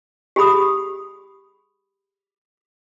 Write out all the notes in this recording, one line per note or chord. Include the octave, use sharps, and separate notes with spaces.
G4 G#4 B5 D#6